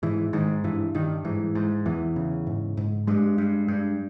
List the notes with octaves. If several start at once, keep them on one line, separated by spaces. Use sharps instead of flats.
G#2 E3
G#2 D#3
G2 E3
G2 D#3
G#2 E3
G#2
E2 E3
C#3
G#2
G#2
G2 G#3
G2
G2